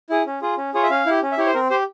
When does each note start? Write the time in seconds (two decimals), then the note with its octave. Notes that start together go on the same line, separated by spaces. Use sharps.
0.10 E4 G#4
0.26 C#4
0.42 F4 G#4
0.57 C#4
0.74 F4 G#4 C#5
0.83 E5
0.90 C#4 F5
1.06 E4 G4
1.22 C#4
1.32 E5
1.38 E4 G4 C#5
1.47 C5
1.54 C4 A#4
1.70 G4 C5